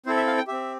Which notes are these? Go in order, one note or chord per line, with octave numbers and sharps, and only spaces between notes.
C4 E4 A4 C5
E5
F5
G5
C4 G4 E5